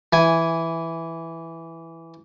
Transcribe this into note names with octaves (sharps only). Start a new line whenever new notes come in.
E3 G#5